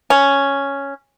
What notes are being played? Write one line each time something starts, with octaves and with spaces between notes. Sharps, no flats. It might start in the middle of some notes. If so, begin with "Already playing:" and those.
C#4